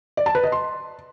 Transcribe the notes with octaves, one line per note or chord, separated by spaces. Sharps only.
D5
A5
B4
D#5
C6